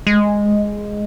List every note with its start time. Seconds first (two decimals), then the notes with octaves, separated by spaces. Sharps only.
0.07 G#3